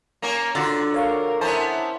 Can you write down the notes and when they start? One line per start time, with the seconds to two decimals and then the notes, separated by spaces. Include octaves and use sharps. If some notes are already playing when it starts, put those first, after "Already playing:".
0.22 A#3 C#4 A#4
0.55 D3 F4 F#4
0.94 A#4 C#5 F5 C#6
1.41 B3 C#4 E4 A#4 C5 A5